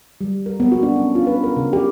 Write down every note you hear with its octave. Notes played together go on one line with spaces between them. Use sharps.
G3
A#4
B3
F#4
D4
C#4
F4
B4
A#4
C#3
G4